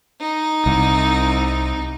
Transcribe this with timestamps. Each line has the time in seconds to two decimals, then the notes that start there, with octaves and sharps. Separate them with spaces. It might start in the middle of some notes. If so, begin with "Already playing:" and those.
0.20 D#4
0.66 C2